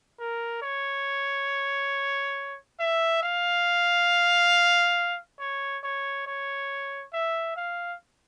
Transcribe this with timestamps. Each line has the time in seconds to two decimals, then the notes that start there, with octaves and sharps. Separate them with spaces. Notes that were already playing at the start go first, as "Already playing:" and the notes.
0.19 A#4
0.62 C#5
2.79 E5
3.23 F5
5.39 C#5
5.83 C#5
6.27 C#5
7.13 E5
7.56 F5